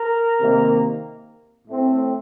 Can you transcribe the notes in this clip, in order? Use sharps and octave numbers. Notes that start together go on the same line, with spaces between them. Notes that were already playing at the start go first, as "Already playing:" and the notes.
Already playing: A#4
C3 D#3 A#3
A2 A3 C4